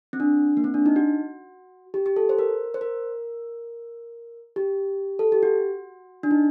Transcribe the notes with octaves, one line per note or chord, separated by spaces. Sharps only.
C4
D4
A#3
C4
D4
D#4
F#4
G4
G4
A4
C5
A#4
C5
A#4
G4
A4
G4
F#4
D4
D#4